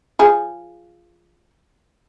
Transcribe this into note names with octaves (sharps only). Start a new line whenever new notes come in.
F3 G#4